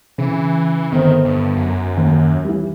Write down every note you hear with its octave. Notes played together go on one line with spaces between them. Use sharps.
C#3 E3
G1 D#3 C5
G2
F#2
D#2
E3 G3